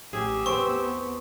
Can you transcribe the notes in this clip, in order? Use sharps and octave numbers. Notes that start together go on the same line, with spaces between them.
A1 G4 G#4 E6
E2 B3 C4 C#6